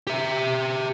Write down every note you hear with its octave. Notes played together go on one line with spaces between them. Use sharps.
G4 E5